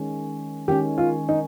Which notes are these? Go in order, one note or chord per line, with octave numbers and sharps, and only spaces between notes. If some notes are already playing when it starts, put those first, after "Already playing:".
Already playing: D#3 G#3 C#4
D#3 G#3 C#4 G4
F4
D#4